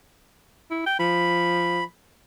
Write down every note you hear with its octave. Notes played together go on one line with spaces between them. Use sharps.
E4
G5
F3 B5